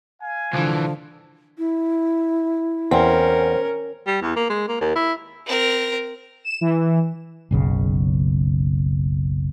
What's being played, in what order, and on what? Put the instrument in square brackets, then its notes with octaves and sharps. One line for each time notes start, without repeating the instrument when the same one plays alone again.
[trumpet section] F5 G#5
[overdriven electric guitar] C2 E3 [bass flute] D3 [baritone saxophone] F3
[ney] E4
[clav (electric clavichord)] E2 [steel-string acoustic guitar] C4 [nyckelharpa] C#4 A#4
[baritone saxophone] G3
E2
A#3
G#3
A#3
D#2
E4
[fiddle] C4 A#4
[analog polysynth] E7
E3
[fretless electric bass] F#1 B1 C#3